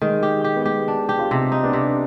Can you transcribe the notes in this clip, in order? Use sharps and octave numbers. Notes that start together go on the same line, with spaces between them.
D#3 G#3
G4
G4
B3
G#3 G4
D4
G4
F4
C3 C4 D#4
D#4
B3 D4
C3